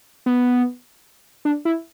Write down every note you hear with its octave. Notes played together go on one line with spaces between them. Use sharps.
B3
D4
E4